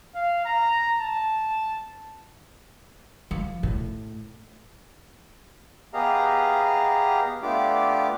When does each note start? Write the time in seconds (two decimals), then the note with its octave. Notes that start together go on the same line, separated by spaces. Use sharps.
0.15 F5
0.46 A#5
1.02 A5
3.31 F3
3.63 A2
5.94 B3 G4 G#4 D#5 F5 A#5
7.42 A3 B3 D4 F4 G4 D6